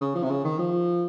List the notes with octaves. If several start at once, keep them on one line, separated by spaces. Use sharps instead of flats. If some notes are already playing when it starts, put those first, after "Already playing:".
C#3
F3
C3
C#3
D#3
F3